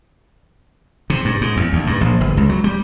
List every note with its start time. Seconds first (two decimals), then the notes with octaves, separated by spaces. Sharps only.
1.10 C3
1.25 G2
1.41 G#2
1.57 E2
1.73 D2
1.87 G2
2.01 A#1
2.21 G1
2.37 C#2
2.49 F#3
2.64 G3